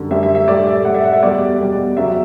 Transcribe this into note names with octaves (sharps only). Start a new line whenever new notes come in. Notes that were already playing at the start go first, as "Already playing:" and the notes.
Already playing: F#2 D3 G3
F#2 D3 G3 E5
E5
E5
A2 G3 D5
E5
A2 G3 F#5
E5
F#5
E5
E2 B2 G3 D5
E2 B2 G3
E2 C#3 F#3 E5